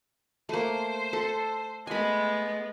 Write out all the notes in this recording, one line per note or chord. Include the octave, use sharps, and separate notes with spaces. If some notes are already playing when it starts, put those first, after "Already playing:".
A3 A#3 C5
A4
G#3 A3 B3 G#5 B5